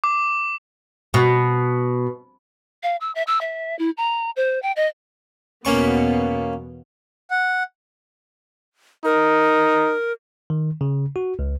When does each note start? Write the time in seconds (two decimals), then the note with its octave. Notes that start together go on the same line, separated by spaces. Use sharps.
0.04 D6
1.14 B2
2.83 F5
3.01 E6
3.15 E5
3.27 E6
3.41 E5
3.79 E4
3.97 A#5
4.36 C5
4.62 G5
4.76 D#5
5.65 E2 B2 A#3 B3 C#4 C#6
7.31 F#5
9.05 D#4 A#4
10.50 D#3
10.81 C#3
11.16 F#4
11.39 C#2